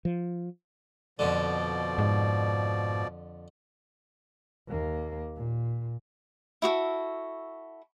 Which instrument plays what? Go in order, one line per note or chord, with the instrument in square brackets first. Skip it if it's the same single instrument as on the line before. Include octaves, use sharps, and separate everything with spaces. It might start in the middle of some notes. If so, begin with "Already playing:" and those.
[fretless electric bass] F3
[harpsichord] F2 D3 [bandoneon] B2 F3 D5
[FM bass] G#2
[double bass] D#2 A#3
A#2
[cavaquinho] E4 F#4 G4 A4